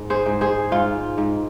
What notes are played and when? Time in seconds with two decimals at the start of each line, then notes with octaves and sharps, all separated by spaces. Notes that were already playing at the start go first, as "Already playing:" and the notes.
Already playing: G#2
0.10 G#4 C5
0.26 G#2
0.41 G#4 C5
0.72 G#2 F4
1.18 G#2